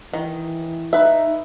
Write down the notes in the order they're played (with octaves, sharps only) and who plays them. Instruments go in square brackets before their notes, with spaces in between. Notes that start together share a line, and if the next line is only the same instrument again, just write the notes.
[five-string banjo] D#3 [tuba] E3
[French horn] D#4 [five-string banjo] B4 E5